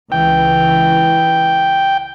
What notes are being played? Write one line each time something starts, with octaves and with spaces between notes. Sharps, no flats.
C#2 E3 G5